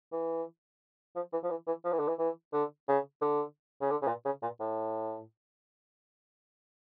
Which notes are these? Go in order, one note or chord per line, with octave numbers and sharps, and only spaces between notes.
E3
F3
E3
F3
E3
E3
F3
E3
D3
E3
E3
D3
C#3
D3
C#3
D3
C#3
A#2
C#3
A#2
A2